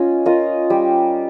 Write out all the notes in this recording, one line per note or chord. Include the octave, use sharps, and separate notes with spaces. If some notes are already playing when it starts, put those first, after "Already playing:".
Already playing: C#4 F4 D#5
F4 A#4 D#5
G3